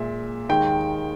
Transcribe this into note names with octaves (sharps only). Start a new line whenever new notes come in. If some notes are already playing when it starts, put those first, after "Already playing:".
Already playing: A#2 G#3 E5
D#2 D#3 G#3 G5